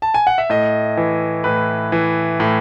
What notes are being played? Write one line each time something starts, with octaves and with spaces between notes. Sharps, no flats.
A5
G#5
F#5
E5
A2 D#5
E3
A2 B4
E3
A2